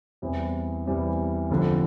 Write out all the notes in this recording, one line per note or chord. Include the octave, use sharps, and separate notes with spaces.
E2 E3 G3 C4
E2 E3 G3 C4
F1 F2 D3 F3